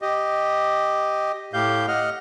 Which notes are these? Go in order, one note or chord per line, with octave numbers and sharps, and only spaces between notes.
G4 D#5
A2 G4 F5 G6
D#5 F#5 F6